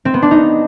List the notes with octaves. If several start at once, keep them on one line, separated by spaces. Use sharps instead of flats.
C4
B3
D4
D#4